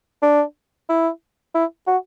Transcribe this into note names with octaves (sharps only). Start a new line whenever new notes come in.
D4
E4
E4
F#4